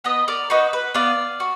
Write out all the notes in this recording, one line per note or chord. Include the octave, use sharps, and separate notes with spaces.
B3 B4 D#5
A#4 D5
D#4 F#4 B4
B4
B3 D5 F5
F#4